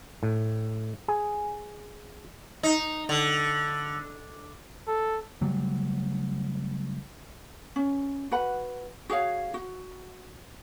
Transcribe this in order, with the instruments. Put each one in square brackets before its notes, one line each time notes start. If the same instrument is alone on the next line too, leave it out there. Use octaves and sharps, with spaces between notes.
[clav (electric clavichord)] A2
G#4
[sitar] D#4
D3
[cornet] A4
[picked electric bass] C#3 F#3 G3 A3
[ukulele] C#4
F#4 B4 F#5 B5
F#4 G#4 C#5 F5
F#4